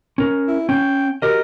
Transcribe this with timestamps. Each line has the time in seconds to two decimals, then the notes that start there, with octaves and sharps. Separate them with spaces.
0.18 C#4 A#4
0.48 E4
0.69 C#4 G5
1.22 F#4 G4 A#4 D#5